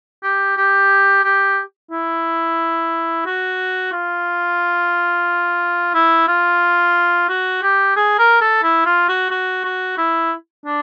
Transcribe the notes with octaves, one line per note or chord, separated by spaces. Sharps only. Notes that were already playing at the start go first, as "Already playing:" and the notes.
G4
G4
G4
E4
F#4
F4
E4
F4
F#4
G4
G#4
A#4
A4
E4
F4
F#4
F#4
F#4
E4
D4